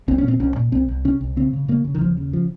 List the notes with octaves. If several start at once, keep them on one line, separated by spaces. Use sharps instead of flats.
C2 C4
C#4
A#2 C4
C2 C#4
A#2
C2 C4
C2
C3 C#4
C2
C#3 C4
C#3
C#3 A#3
C#3
D#3
D#2 F3
C#3
F3